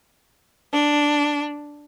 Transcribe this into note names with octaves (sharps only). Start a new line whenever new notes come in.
D4